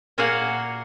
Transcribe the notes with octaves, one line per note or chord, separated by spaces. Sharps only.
A#2 A#3 F#4 G#4 F5 F#5